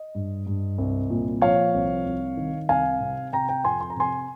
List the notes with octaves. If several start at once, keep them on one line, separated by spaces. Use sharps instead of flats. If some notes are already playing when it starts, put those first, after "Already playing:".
Already playing: D#5
G2
G2
C2
A#2
F3 C#5 F5
C2
C2
D#3
C2 F5 G#5
C3
C3 G5 A#5
G5 A#5
F2 G#5 C6
C6
A#5
C3 G#5 C6